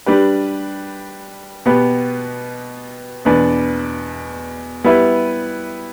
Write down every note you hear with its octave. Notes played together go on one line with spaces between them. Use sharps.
G3 D4 G4 B4
B2 B3 G4 B4
E2 B2 B3 D4 B4
G3 B3 E4 B4